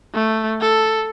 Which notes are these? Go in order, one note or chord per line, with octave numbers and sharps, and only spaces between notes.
A3
A4